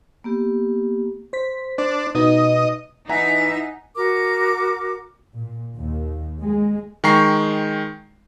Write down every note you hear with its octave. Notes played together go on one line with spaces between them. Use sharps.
A#3 B3 G4
C5 B6
D4 C5
B2 B3 D#4 D#5
E3 D#4 E5 F#5 G#5 A#5
F#4 A#4 D6
A#2
D#2
G#3
D#3 G#3 G5 A#5 C#6 C7